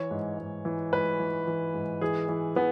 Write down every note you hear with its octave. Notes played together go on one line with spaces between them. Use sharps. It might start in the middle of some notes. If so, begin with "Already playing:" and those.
Already playing: E3 C#5
G#2
G#2
E3
G#2 B4
E3
E3
G#2
E3 G#4
E3
E3 B3